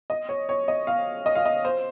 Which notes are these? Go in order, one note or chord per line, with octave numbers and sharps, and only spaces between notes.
D#5
C#5
C#5
D#5
F5
D#5
F5
D#5
C5